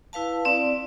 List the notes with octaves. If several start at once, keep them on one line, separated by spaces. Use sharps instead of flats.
E4 B4 F5 A5
C4 D5